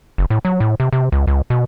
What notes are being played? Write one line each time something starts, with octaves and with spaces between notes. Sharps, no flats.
F#1
A2
F#3
A2
C3
C3
C#2
C#2
B2